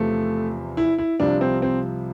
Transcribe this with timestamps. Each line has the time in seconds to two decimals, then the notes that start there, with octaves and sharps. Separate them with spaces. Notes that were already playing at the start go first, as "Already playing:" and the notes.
Already playing: E2 C3 F3 A3
0.77 E4
0.98 E4
1.20 C2 C3 F3 D4
1.41 C4
1.62 C4